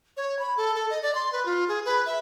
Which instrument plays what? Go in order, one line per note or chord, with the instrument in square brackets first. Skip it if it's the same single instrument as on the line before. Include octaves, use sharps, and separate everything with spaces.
[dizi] C#5
B5
A4
A4
D#5
D5
C6
B4
F4
G#4
B4
E5